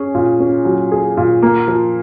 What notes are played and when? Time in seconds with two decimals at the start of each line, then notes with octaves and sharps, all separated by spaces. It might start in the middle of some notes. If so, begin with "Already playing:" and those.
Already playing: C#4 G#4
0.15 A#2
0.40 C#4
0.65 F#3
0.92 G#4
1.17 A#2
1.42 A#3
1.68 F3